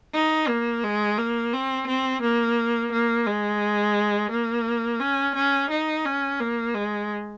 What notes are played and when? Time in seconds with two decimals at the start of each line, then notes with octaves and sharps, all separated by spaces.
0.14 D#4
0.48 A#3
0.84 G#3
1.18 A#3
1.53 C4
1.87 C4
2.22 A#3
2.92 A#3
3.26 G#3
4.31 A#3
5.00 C#4
5.35 C#4
5.70 D#4
6.05 C#4
6.40 A#3
6.74 G#3